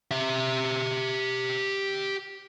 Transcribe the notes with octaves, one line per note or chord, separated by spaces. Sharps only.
G4 E5